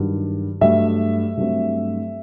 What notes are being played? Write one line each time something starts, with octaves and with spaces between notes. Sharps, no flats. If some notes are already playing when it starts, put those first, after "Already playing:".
Already playing: G2 D#3 F#3
G2 F#3 A3 E5
G2 F#3 A3 C4